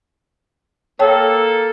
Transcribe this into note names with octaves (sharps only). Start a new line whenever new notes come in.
A#3 A4 C#5 G5 A5